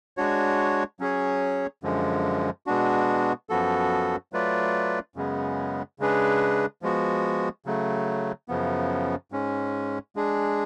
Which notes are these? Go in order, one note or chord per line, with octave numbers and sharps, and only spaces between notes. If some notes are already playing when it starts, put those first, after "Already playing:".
G#3 D4 F#4 C#5
F#3 C#4 G#4 C#5
F#2 D3 F3 G#3
B2 G#3 B3 D4 F#4
F#2 F3 B3 F#4 A4
F#3 A3 F4 B4 D5
F#2 C#3 G#3 B3
C#3 G#3 D4 G#4 B4
F3 G#3 B3 F#4
C#3 F#3 A3
F#2 C#3 F3 B3
G#2 G#3 C#4
G#3 D4 G#4